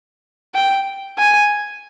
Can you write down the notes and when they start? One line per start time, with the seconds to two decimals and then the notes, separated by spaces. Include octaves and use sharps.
0.55 G5
1.18 G#5